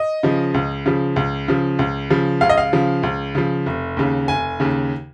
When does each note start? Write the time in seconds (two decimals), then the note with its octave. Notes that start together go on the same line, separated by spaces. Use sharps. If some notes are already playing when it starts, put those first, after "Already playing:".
Already playing: D#5
0.23 C#3 F3
0.54 C#2
0.86 C#3 F3
1.16 C#2
1.48 C#3 F3
1.79 C#2
2.10 C#3 F3
2.41 C#2 F5
2.49 D#5
2.57 F5
2.73 C#3 F3
3.03 C#2
3.35 C#3 F3
3.66 F1
3.97 D#2 C#3
4.28 F1 G#5
4.60 D#2 C#3